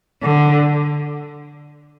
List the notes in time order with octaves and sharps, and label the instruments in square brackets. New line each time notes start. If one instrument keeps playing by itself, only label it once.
[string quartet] D3